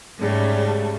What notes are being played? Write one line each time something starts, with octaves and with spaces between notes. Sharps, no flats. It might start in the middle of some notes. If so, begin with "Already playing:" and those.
G#2 C#3 G3 A3